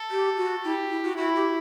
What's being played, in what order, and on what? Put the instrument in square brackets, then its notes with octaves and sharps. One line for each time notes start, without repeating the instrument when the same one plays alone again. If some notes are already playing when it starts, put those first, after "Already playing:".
Already playing: [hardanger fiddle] A4
[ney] G4
F#4
[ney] E4 [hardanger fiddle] G4
[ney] E4
F#4
[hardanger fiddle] E4 [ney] F#4
[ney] G4